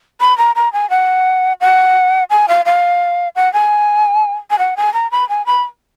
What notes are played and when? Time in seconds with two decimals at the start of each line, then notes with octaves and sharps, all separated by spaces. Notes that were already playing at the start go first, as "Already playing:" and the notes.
0.20 B5
0.38 A#5
0.56 A#5
0.73 G#5
0.90 F#5
1.61 F#5
2.30 G#5
2.48 F5
2.65 F5
3.36 F#5
3.53 G#5
4.50 G#5
4.59 F#5
4.77 G#5
4.94 A#5
5.11 B5
5.29 G#5
5.46 B5